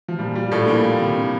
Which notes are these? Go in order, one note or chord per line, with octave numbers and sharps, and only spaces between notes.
F3
A#2 G3
G3 F4
A2 A3 D4
A#2 F3 A#3
G4
C3
F3